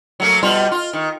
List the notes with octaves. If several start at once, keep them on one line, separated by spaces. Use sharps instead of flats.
F#3 A3 A#3
B2 G3 F4
F4
D#3